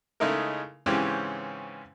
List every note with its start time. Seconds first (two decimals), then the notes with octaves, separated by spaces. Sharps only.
0.20 C#3 G#3 A3 D#4 E4 A#4
0.86 G#2 C#3 E3 C4 C#4 G4